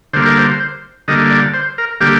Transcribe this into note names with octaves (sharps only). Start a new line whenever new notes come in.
D3 G3 A#3 C5
A#4
C5
D3 G3 A#3 D#5
D5
C5
A#4
D3 G3 A#3 G4